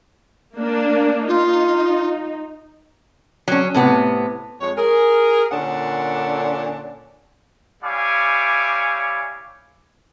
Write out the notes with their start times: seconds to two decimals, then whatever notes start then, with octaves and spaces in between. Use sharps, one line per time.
0.55 A#3 D4
1.28 D#4 F4
3.48 F#3 C#4
3.74 A2 C3 B3
4.61 F2 G#3 C#5
4.77 G#4 A#4
5.51 A#2 D3 C#4 D4 F#5
7.83 G3 E4 C#5 F5 G#5 D6